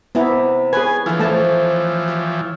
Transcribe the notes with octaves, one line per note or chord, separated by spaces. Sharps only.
C3 B3 D#4 E4 D5
B3 E4 G#4 B4 C#5 G#5
D3 E3 F3 B3
A3 C4 C5 C#5 A5
G4 C#5